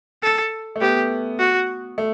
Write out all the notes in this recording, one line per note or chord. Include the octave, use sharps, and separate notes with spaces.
A4
A3
B3 G4
F#4
A3